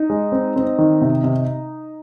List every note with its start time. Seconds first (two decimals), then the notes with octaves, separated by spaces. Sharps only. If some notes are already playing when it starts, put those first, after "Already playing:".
Already playing: D#4
0.10 G#3
0.32 C4
0.56 C4
0.78 D#3
1.01 C3
1.24 C3